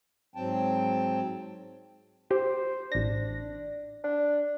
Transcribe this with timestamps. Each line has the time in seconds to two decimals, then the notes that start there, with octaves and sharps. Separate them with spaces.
0.36 G#2 F#3 C4 G5 A5
2.31 G4 C5
2.92 A1 D4 A#6
4.04 D4